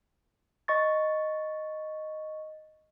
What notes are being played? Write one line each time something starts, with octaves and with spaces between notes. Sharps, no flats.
D#5 C#6 A6